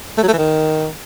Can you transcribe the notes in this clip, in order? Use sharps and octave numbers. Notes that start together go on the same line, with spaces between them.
A3
F#3
A3
E3
D#3